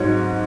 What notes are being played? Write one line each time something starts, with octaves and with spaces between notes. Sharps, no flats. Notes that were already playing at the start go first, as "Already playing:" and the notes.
Already playing: G#2 F#3 C#5